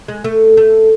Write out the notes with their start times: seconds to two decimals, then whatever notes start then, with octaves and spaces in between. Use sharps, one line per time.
0.08 G#3
0.24 A3
0.57 A3